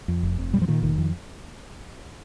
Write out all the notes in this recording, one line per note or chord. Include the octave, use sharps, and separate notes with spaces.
F2
F1
F2
A#2 G3
F3
A#2 D#3
F1 D#3
F2